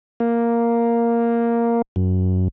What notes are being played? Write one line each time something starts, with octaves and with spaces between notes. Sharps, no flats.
A#3
F#2